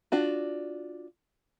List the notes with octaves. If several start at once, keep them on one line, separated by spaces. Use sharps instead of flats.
D4 F4 F#4